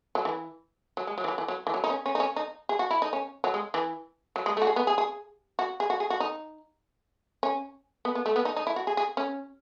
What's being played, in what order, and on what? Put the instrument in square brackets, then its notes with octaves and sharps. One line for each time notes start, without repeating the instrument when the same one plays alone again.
[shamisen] F#3
E3
F#3
G#3
F#3
E3
F#3
E3
F#3
E3
F#3
D#4
C#4
C#4
D#4
C#4
D#4
G#4
F#4
E4
D#4
C#4
F#3
G#3
E3
F#3
G#3
A3
F#4
G#4
B3
G#4
G#4
F#4
G#4
F#4
G#4
F#4
D#4
C#4
B3
B3
A3
B3
D#4
D#4
E4
F#4
G#4
G#4
C#4